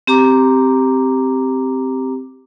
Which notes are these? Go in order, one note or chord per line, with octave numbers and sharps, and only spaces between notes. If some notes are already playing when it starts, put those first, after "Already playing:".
C4 G4 A#5 D6